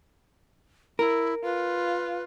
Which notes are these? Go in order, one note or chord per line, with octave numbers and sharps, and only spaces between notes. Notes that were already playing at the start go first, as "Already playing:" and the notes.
E4 A#4
F4 B4